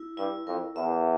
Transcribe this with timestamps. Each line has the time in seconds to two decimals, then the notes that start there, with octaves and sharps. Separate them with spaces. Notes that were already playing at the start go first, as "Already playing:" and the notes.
Already playing: E4
0.17 G2 E4
0.47 F2 A#4
0.76 E2 E5